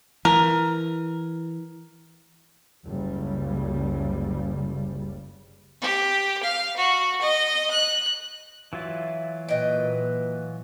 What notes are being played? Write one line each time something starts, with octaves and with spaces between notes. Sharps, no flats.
E3 A#4
F#1 C#2 C#3 G3
G4
F5
F#4
D#5
F#6
E3 F#3 F4 E5
A#2 B4 D#5 G5